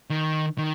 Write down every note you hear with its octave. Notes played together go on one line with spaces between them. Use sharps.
D#3
D#3